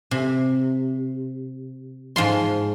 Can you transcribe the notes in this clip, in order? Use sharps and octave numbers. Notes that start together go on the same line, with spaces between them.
C3
G#2 F3 C6